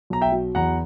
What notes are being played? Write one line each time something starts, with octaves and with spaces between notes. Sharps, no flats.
B1 A#5
E5 G5
F#3
E2 F#5 A#5